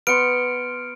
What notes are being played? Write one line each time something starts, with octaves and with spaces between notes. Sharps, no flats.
B3 C6 F6 C#7 D7